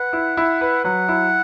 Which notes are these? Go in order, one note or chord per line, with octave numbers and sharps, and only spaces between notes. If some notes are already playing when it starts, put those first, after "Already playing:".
Already playing: B4 F#5
E4
E4
B4
F#3 F#5
E4